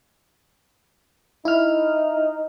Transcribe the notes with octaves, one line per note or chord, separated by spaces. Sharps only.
D#4 E4 F6